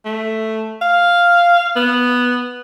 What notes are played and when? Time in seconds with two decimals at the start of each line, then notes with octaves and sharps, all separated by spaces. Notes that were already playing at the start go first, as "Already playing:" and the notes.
0.05 A3
0.82 F5
1.76 B3